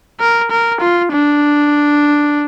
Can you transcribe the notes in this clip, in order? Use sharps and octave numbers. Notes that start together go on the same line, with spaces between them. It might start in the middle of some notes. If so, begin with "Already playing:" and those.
A#4
A#4
F4
D4